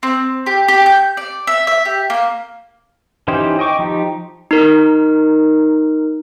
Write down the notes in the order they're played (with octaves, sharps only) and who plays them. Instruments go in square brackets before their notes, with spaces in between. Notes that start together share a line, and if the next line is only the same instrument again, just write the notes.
[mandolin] C4
G4
G4
G6
D5
E5
E5
G4
A#3
[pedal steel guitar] E3 C#4 D#4 G4 C5
D#5 G5 C#6 D6
F3 D#4 G4
[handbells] D#4 A#4